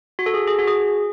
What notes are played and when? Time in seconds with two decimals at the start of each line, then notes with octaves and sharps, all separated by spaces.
0.19 F#4
0.26 A4
0.34 G#4
0.48 G#4
0.59 F#4
0.68 G#4